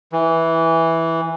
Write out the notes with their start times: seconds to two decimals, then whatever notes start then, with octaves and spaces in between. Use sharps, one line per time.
0.12 E3